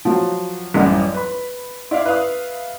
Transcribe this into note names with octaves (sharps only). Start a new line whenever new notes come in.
F3 F#3
A1 F#2 E3 G3 D#5 F#5
B4 B5
E4 D5 E5 F5
B4 E5 F5 D#6